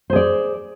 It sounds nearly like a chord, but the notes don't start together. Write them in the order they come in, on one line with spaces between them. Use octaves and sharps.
C5 G#4 D5